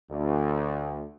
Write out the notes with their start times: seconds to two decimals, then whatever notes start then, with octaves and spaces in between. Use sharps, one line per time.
0.11 D2